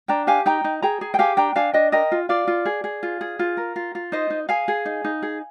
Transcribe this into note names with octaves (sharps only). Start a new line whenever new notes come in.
D4 G5 A#5
G4 F5 G#5
D#4 G5 A#5
D#4
G#4 G5 A#5
G#4
G5
G4 F5 G#5
D4 G5 A#5
D4 F5 G#5
D4 D#5 G5
A#4 D#5 G5
F4
F4 D5 F5
F4
G#4
G#4
F4
G#4
F4
A#4
F4
F4
D#4 C5 D#5
D#4
G#4 F5 G#5
G#4
D#4
D#4
G#4